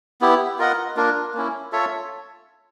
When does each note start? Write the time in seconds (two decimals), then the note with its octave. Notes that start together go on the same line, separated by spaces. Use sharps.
0.21 B3 E4 G4
0.58 F4 A#4 D#5 F#5
0.96 A#3 D4 F4 A#4
1.34 A#3 C#4 E4
1.72 F4 A4 C#5 E5